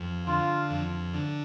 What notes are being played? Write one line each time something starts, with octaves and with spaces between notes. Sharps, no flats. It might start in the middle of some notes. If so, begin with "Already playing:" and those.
Already playing: F2
D3 F4
F2
D3